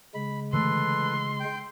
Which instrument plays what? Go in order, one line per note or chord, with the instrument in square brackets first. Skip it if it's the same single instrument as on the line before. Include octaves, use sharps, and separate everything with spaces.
[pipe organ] C#3 G#3 [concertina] B5
[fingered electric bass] D3 E3 A3 [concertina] A4 B4 [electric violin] C6
[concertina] G5